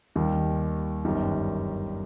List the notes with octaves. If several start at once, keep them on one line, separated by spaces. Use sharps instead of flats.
D#2 D#3 G3
G1 F#2 D#3 G3